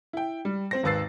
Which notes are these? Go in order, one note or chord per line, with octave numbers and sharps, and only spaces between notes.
E4 G5
G3
C4 C5 A#6
G#1 D#2 B4 E6 A6 C7